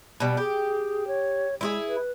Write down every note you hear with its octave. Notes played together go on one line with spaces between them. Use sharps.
B2 G3
G4 G#4
C#5
G#3 E4 F4 G#4
B4